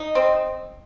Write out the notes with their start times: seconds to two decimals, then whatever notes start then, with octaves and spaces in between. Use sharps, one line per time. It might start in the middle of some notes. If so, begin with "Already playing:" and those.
Already playing: D#4
0.15 C4